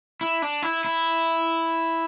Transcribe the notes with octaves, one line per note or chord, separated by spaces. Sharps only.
E4
D4
E4
E4